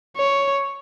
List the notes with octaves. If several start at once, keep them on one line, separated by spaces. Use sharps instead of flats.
C#5